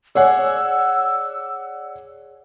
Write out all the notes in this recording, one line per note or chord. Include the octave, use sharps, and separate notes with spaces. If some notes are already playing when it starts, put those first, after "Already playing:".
G#4 C#5 D5 F#5 E6